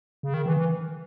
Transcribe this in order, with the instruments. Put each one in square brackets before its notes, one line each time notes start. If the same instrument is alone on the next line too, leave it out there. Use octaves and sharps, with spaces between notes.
[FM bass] C#3
D#3
E3
E3